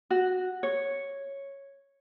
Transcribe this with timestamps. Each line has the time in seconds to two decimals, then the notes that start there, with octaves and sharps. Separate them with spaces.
0.10 F#4
0.63 C#5